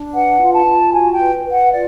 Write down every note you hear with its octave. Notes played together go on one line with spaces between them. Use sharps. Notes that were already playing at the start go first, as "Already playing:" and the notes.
Already playing: D4
B4 F#5
F4
A5
F4
F#4 G#5
G5
B4
B4
F#5
F4 D5